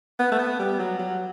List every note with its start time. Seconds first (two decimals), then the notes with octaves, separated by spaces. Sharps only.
0.20 B3
0.32 A3
0.39 B3
0.59 G3
0.79 F#3
0.99 F#3